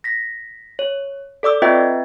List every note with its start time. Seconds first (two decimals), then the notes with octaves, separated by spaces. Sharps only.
0.04 A#6 B6
0.79 C#5
1.43 A4 D5 D6 E6
1.62 C4 F4 B4 D#5 E5 G5